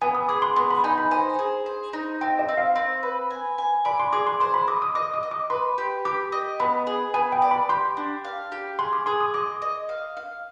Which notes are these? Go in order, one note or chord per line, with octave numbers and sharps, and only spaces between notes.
B3 G#5
D#6
G#4 D6
C6
B3 C6
B5
D#4 G#5
B5
C5 G#5
G#4
C5
D#4
C4 G5
D#5
C4
F5
C4
B4
G#5
G#5
D5 B5
C6
G#4 D6
C6
C5 C6
B5
D#5 D6
D#6
D#5 D6
D#6
D#5
D6
B4 C6
G4
G4 D6
D#5
B3 B5
G#4
B3 G#5
G5
D5
B5
G4 C6
D4
F5
G4
G#4 C6
D6
G#4 C6
D#6
D#5 D6
D#5
F5
F5